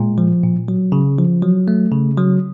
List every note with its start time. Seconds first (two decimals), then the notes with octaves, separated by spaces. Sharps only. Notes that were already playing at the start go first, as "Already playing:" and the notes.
Already playing: A#2 G#3
0.18 F3
0.43 A#2
0.68 F#3
0.92 C#3
1.18 F3
1.42 F#3
1.68 A3
1.92 C#3
2.18 F#3